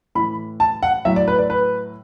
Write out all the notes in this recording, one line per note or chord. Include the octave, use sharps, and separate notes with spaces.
A2 E3 B5
A5
F#5
A2 F#3 E5
D5
B4
D5
B4